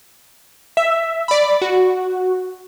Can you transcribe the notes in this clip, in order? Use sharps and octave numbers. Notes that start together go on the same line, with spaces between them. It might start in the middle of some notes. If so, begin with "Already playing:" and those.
E5
D5 B5
F#4